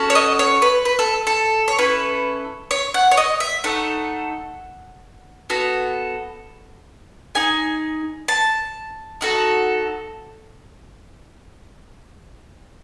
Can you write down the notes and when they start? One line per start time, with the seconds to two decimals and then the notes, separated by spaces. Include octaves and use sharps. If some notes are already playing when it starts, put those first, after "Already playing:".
Already playing: C#4 F#4 A4
0.10 C#5
0.15 D#5
0.39 C#5
0.62 B4
0.85 B4
0.99 A4
1.27 A4
1.68 C#5
1.78 C#4 E4 A4 B4
2.71 C#5
2.94 F#5
3.11 C#5
3.17 D#5
3.40 E5
3.64 A3 D#4 A4 F#5
5.50 B3 F#4 A4
7.35 D#4 G#4 G#5
8.28 A5
9.21 D#4 F#4 A4